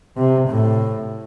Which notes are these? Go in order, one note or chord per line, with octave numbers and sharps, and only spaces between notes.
C3
A2